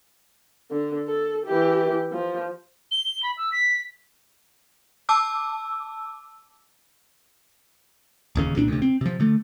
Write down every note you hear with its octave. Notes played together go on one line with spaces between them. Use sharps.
D3
A4
E3 G4
F3
G7
B5
E6
B6
A5 D6 E6
D1 D#2 C#3
C2 A#2 C#4 D4
D2 C3
C4
C3 F3
D3 A3